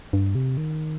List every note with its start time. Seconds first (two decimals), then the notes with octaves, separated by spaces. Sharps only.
0.13 G2
0.35 C3
0.57 D#3